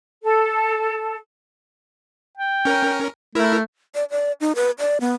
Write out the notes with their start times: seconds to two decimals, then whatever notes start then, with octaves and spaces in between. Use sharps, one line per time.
0.23 A4
2.37 G5
2.65 C#4 A#4
3.35 A3 E4 A#4
3.95 D5
4.10 D5
4.41 D#4
4.56 B4
4.79 D5
5.01 B3